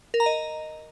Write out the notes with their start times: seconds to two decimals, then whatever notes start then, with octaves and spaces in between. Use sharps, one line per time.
0.14 A#4
0.20 A#5
0.26 D#5